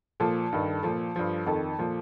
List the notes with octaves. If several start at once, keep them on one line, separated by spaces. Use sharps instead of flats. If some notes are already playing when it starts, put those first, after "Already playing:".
A#2 F3 A4
G2 D#3
A#2 F3 A4
G2 F3
F2 D#3 A4
A#2 F3